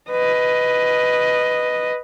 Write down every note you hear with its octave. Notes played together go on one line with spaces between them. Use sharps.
B4 D#5